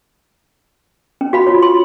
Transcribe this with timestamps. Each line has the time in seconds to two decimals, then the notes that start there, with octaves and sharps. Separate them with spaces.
1.21 C#4
1.33 F#4 F5 B5
1.47 F4 F#4 C#5
1.63 C6